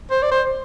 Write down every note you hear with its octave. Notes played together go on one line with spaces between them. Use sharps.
C5
D5
C5